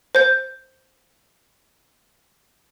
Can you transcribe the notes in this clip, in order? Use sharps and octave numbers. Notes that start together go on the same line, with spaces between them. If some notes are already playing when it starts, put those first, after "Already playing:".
C5 G6